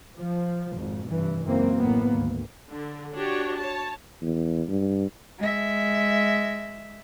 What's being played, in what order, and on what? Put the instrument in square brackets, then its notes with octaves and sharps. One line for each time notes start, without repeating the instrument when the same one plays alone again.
[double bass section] F3
G#1 F2
F1 G2 E3
C#2 F#2 E3 A#3 C4
A1 A2 A#3 B3
G#1 D2
[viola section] D3
D4 F#4 G4 C#5
C#5 A5
[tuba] E2
G2
[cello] G#3 E5